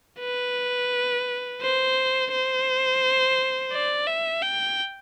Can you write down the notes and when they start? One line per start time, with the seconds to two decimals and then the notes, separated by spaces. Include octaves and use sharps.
0.20 B4
1.62 C5
2.32 C5
3.73 D5
4.07 E5
4.42 G5